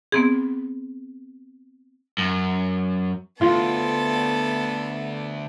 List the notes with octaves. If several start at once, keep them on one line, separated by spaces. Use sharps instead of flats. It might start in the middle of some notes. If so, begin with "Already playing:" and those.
B3 C4 G#4
F#2
D2 B3 F4 A4